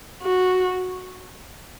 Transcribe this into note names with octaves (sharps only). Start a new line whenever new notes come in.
F#4